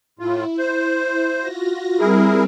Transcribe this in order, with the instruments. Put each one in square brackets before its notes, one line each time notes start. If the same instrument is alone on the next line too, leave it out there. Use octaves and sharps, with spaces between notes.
[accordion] A2 F4 [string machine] E4
[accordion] C5
[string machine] F4 F#4 A#6
[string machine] G3 C4 [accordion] E4 G#4 A#4